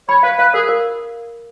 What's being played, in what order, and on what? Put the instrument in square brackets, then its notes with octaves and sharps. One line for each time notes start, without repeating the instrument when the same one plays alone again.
[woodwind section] C#5 [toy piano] B5
[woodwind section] B4 [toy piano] F5
[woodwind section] B4 [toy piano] F5
[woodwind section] G#4 [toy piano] A#4
[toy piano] A#4